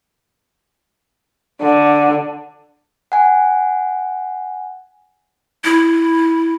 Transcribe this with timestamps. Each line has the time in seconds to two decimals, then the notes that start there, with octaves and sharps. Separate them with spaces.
1.63 D3
3.12 F#5 G#5
5.64 E4